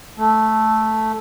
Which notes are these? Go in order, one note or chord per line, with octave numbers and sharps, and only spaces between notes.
A3